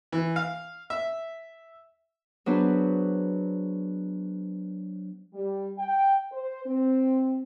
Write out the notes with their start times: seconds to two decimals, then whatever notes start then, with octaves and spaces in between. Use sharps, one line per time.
0.12 E3
0.36 F5
0.90 E5
2.46 F#3 B3 D4 G#4 B4 C5
5.34 G3
5.78 G5
6.32 C5
6.66 C4